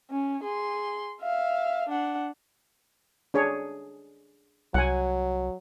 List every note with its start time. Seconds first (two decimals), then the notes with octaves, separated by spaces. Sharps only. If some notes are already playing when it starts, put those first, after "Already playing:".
0.11 C#4
0.44 G#4 C6
1.22 E5 F5
1.89 D4 F#5
3.34 D4 G#4 C#5
4.74 C2 F#3 F#5 G#5